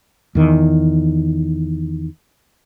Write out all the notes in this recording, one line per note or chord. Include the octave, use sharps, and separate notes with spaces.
E2 D#3